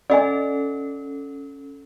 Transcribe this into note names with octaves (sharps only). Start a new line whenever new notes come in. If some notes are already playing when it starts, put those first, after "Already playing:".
C#4 A4 D5 D#5 G#5